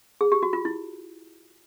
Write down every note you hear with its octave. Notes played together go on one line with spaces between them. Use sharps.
G#4
G4
F#4
F4
E4